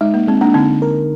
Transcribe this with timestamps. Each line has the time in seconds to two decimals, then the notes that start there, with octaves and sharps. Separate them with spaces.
0.01 G#3 D#4
0.14 A#3
0.28 G#3 C4
0.41 A#3 D4
0.54 D3 C4 D#4
0.82 A#4